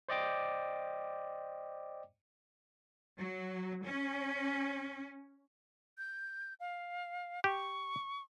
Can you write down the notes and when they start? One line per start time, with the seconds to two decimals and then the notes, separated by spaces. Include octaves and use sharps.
0.09 C5 D5 D#5 G5 D6
3.19 F#3
3.84 C#4
5.98 G6
6.60 F5
7.44 G4 C#6